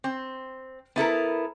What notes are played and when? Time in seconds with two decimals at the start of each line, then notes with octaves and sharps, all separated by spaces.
0.04 C4
0.96 B3 E4 A4 A#4